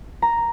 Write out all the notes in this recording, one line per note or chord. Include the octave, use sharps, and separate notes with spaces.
A#5